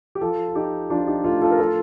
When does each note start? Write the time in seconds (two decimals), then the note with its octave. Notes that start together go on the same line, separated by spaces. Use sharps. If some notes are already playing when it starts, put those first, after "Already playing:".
0.15 G4
0.21 F3 F4 A4
0.48 F4
0.55 F3 D#4 G4
0.90 F3 D4 F4
1.07 D#4 G4
1.24 A2 F4 A4
1.42 F4 A4
1.51 A#4
1.59 F3 F4 A4